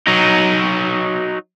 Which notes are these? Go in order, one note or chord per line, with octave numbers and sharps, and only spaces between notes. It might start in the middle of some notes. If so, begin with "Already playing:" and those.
F#3 D#4